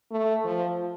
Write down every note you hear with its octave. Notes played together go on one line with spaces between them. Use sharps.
A3
F3